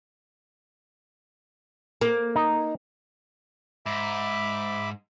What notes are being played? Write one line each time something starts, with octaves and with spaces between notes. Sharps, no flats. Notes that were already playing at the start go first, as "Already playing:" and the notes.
A#3
D#4
G#2 E5 B5 D6